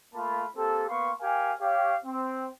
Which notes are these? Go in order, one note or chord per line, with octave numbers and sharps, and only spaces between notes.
A3 A#3 F4 A5 B5
A#3 C4 G4 A4
A#3 B3 B4 F5 C6 C#6
G4 A#4 F5 G#5
G4 C#5 F5
C4